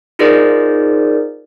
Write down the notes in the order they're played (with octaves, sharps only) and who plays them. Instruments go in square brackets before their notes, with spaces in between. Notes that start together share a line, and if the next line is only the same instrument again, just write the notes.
[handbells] D#4 F4 G#4 A#4 C5 D5